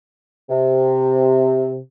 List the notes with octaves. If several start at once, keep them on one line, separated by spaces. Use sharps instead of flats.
C3